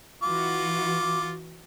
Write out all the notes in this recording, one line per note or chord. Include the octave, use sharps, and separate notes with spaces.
E3 F4 F#4 D6